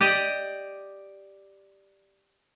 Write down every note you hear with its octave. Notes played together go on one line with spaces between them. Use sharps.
G4 D5 D#5